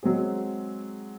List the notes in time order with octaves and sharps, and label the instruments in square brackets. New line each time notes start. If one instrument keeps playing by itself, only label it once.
[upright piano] F#3 G#3 C4 G#4